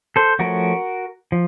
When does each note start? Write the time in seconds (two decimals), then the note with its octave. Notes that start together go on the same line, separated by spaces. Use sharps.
0.16 A4 C5
0.39 F3 A3 C#4 F#4 A#4
1.32 F3